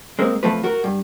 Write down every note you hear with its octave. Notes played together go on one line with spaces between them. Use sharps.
G#3 A#3 C4
F2 C3 F3 A3 B4
F#4 A#4
G2